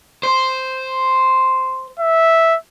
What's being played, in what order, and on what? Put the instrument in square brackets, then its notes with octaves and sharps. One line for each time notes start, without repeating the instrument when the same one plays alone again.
[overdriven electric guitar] C5
[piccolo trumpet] E5